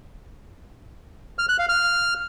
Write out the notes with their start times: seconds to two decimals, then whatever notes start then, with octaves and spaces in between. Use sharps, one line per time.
1.39 F6
1.49 F#6
1.59 F5
1.69 F6